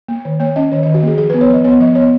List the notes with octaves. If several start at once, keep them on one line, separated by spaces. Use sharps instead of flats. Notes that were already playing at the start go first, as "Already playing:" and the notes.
A#3
D#3 C#5
A#3 C#5
C#4 D#5
D#3 C#5
D#3 D#5
F#4
A#3 G#4
F3 G#4
B3 B4
C#5
F3 D#5
B3 C#5
F3 D#5
B3 C#5